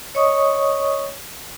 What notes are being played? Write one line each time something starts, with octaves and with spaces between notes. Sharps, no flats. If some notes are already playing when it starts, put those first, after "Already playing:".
C#5 D#5 C#6 D#6